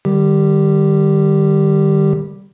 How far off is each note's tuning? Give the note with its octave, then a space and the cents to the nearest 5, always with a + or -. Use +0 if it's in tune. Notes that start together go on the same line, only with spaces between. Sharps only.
D#3 -40 G3 +0 G4 +0